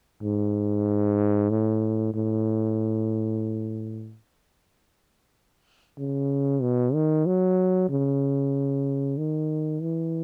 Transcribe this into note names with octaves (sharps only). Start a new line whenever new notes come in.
G#2
A2
A2
C#3
B2
D#3
F#3
C#3
D#3
E3